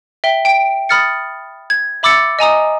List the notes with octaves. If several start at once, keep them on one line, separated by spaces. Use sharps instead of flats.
E5 G5 G7
G5 D7
B5 D#6 F6 A6 C#7
G#6
E5 B5 D6 E6 A6 C#7
D#5 G#5 A#5 D#6